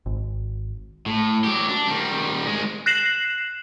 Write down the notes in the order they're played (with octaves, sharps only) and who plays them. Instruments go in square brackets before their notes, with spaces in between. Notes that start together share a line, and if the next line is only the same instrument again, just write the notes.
[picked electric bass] G#1
[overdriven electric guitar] A2
F#3 G4
D4
D#3 G3
D#3 G#3
[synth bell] F#6 A#6 C7 E7 F#7